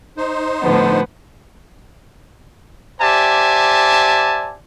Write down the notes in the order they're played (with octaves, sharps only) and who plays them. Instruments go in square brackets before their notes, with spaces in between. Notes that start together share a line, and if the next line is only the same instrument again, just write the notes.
[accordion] D#4 C5
[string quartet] A2 D3 F3 [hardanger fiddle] B3
[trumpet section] G4 C5 D5 E5 G#5 A5